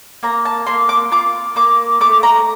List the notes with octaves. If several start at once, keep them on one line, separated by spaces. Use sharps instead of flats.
A#3 A#5
A5
A#3 C6
D6
F4 D6
A#3 D6
A3 D6
A#5